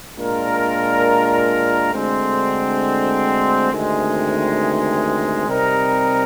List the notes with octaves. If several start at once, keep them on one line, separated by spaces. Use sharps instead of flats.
A#2 G#3 D4 F4 A#4
D2 D3 G#3 C4
D2 C3 D#3 G#3
C3 G3 C4 D#4 A#4